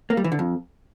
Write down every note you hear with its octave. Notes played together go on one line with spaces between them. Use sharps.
A#3
G3
E3
D3
F2